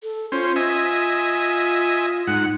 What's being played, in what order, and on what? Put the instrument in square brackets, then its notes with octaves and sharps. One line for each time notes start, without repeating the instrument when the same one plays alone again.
[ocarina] A4
[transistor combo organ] C#4 C5 [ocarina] F4
[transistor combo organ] D#5 E5 G#5
[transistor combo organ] G#2 F#5 [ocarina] D#4